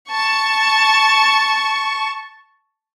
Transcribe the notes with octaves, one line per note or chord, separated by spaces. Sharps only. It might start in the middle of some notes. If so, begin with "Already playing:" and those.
A5 C#6